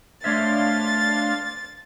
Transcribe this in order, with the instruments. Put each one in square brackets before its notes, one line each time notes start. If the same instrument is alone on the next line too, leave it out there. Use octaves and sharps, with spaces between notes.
[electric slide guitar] A3 C#5 E5 [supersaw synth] D4 F5 C6 [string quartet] A6